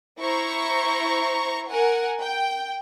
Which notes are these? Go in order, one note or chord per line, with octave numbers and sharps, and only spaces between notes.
E4 C5 A#5 C#6
A#4 F#5 G#5
G5